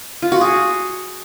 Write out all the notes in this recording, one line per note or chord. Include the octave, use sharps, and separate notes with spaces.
F4
F#4
G#4